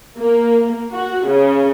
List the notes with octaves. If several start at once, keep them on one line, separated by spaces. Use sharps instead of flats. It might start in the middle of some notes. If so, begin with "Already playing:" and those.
A#3
F#4
C#3